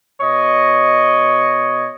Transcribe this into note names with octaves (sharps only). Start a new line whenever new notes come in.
B2 C#5 D#5